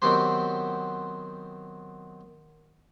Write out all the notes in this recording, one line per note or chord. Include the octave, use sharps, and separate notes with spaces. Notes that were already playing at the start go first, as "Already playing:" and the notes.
D#3 F#3 B3 C4 G4 C5